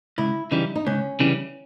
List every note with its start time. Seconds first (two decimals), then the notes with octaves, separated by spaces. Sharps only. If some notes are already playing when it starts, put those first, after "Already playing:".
0.18 C#2 E4
0.51 C#3 E3 G3 D#4
0.76 D#4
0.86 C#2 C#4
1.20 C#3 E3 G3